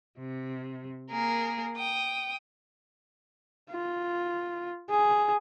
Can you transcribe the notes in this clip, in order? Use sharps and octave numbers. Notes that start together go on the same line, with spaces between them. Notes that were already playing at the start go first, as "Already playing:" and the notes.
C3
A#3 G#4 A#4
G5 D#6
F4
G#4